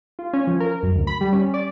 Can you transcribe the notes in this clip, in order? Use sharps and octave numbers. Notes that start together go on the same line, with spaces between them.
F4
C#4
F3
A#4
F#2
D2
B5
G3
C#4
D5